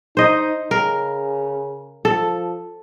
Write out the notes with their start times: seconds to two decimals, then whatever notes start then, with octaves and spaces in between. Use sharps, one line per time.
0.17 D#4 C5 D#5
0.71 C#3 A#4
2.05 F3 A4